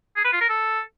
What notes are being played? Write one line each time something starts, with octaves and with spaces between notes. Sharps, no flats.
G#4
B4
F4
A#4
A4